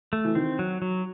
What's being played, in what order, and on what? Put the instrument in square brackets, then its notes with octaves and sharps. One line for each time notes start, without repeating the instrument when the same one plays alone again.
[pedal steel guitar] A3
[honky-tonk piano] E3
[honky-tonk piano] D#3 [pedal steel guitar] C4
[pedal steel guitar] F#3
F#3